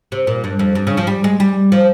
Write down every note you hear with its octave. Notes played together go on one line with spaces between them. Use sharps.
C3
A#2
G2
F2
G2
C#3
F3
G3
G#3
G3
F3